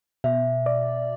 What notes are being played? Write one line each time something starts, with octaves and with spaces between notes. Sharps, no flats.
B2 E5
D5